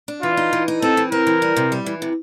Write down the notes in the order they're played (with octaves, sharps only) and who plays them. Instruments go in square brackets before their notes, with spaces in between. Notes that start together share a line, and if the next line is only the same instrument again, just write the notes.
[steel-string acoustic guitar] D4
[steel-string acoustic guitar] E3 [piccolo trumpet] F4
[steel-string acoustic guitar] D#4
E3
D#4
[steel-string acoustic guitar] C4 [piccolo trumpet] A4
[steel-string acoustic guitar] E3
[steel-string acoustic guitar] C4 [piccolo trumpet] A#4
[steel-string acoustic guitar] E3
G3
C3
G3
E3
C3